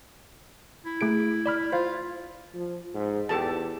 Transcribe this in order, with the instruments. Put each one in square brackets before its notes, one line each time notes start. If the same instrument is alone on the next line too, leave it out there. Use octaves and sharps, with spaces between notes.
[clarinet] E4
[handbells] A3 G#4 D7
D5 B5 F6
[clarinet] F4 [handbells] C5 F5
[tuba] F3
G#2
[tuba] E2 [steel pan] G4 A4 A5